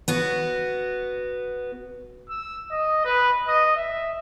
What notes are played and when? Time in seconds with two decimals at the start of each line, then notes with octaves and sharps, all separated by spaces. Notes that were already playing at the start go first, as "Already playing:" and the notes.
0.08 B3 F#4
2.30 E6
2.72 D#5
3.05 B4
3.48 D#5
3.76 E5